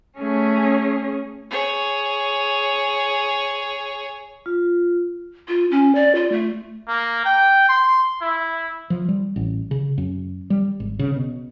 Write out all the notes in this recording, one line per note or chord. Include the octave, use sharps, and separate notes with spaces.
A3 C#4 G#4
G#4 C#5
F4
F4
C#4
D5
F4
A3
A#3
G5
C6
E4
F3
G3
A1
C#3
F#2
G3
G#1
C#3
B2